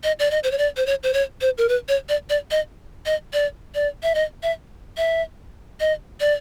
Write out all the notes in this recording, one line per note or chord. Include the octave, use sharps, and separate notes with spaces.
D#5
D5
D#5
C5
C#5
D5
C5
C#5
C5
C#5
C5
A#4
B4
C#5
D5
D5
D#5
D#5
D5
D5
E5
D#5
E5
E5
D#5
D5